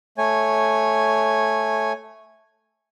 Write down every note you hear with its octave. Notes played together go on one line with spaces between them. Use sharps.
A3 C#5 G#5